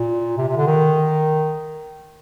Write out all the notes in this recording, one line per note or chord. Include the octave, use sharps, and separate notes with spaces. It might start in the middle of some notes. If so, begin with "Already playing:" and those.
Already playing: A#2
C3
C3
D3
D#3